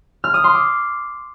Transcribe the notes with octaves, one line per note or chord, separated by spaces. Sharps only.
F6
D#6
C6
D6